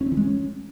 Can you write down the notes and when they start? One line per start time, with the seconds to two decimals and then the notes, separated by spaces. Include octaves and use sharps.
0.01 C#4
0.06 C4
0.12 E3
0.17 G#3
0.23 C#4